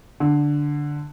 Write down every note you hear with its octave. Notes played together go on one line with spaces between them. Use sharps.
D3